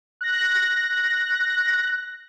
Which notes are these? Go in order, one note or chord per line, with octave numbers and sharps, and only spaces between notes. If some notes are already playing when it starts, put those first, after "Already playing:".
F#6 A#6